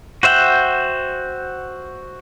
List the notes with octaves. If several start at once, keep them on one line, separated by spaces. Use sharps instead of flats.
F#4 C5 E5 F#5 G5